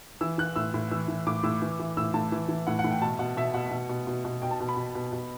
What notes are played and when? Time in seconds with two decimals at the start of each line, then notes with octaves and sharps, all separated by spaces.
0.21 E3 E6
0.38 E3 F#6
0.56 A2 E6
0.74 A2
0.91 E3 E6
1.08 E3
1.26 A2 D6
1.43 A2 E6
1.62 E3
1.80 E3
1.97 A2 E6
2.14 A2 A5
2.32 E3
2.49 E3
2.67 A2 F#5
2.79 F#5
2.84 A2
2.91 G5
3.01 B2 A5
3.19 B2 F#5
3.37 B2 E5
3.54 B2 F#5
3.71 B2
3.89 B2
4.07 B2
4.25 B2
4.42 B2 G5
4.51 A5
4.60 B2
4.69 B5
4.77 B2
4.95 B2
5.12 B2